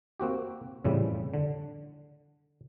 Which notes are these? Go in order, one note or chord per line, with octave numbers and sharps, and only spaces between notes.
A#3 C4 F#4 G4
F2 A2 C#3 E3 G3
D3